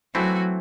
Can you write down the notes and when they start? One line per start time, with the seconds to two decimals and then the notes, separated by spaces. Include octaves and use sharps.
0.14 E3 F#3 A3 C4 E4 F#4